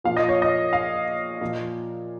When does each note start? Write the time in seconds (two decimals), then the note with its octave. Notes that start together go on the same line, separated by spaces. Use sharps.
0.04 A#2 F3 F5
0.17 D#5
0.29 C#5
0.42 D#5
0.73 F5
1.41 A#2 F3